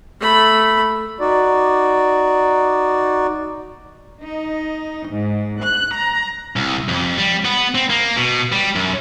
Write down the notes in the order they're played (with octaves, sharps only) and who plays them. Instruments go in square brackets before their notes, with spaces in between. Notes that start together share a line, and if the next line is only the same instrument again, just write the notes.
[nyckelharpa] A3 B5
[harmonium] D#4 F#4 D5
[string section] D#4
G#2
F#6
A#5
[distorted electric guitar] C2
F2
G3
B3
C4
A#3
B2
G3
F#2